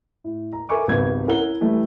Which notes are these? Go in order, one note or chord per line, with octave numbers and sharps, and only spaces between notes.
A2
A#5
A4 A#4 E5 G#5 C#6 D6
G#1 C#2 G3 B3 G#6
C#4 E4 A#4 F#5 G7
E3 G3 A3